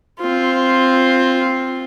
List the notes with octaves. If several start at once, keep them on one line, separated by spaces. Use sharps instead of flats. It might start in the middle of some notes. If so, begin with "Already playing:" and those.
C4 F4